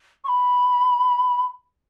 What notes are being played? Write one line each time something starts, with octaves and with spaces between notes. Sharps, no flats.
C#6
B5